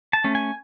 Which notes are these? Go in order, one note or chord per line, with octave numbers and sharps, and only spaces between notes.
A5
A3 C#4
G#5